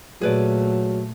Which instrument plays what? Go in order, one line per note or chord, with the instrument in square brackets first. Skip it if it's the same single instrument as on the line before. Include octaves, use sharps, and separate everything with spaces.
[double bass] A#2 A3 [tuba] F#3 [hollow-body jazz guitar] G#4 B4 D5